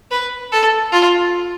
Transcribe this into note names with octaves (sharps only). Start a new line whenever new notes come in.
B4
A4
F4